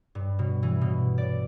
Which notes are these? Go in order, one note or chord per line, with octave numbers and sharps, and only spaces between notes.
G2
B2
E3
B2
D5